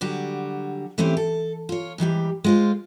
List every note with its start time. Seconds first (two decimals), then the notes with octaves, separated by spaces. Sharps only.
0.01 D3 F#3 G3 F#4 G4
0.98 E3 A3 C4 C#4 E4 G4
1.17 A4
1.69 F4 C#5
1.98 G#2 E3 G3 G4
2.44 G#3 F4 C5